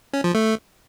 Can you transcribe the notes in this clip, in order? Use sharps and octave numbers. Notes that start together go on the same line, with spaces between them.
C#4
F3
A3